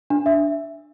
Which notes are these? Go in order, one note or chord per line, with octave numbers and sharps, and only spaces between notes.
D4
E5